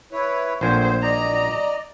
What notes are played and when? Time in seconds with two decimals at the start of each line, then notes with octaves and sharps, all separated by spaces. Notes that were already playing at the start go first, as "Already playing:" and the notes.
0.12 E4 B4 C#5
0.61 A#1 A#2 A3 B3 C4 C5 G#5
1.02 D5 D#5 A#5